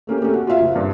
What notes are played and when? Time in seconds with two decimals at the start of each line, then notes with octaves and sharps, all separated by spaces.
0.07 A3 A#3 C#4 G4
0.22 A3 C4 C#4 G4
0.34 F#4
0.47 F4 F#4 C5 E5 F5
0.60 F#1
0.76 G2